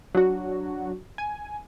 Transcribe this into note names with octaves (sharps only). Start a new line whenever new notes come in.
F#3 D4 F#4
G#5